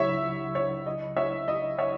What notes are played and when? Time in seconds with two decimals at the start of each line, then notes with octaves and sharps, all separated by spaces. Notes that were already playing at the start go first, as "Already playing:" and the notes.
Already playing: C#2 C#3 F#3 C#5 E5
0.55 C#5
0.86 D#5
1.17 C#5 E5
1.48 D#5
1.78 C#5 E5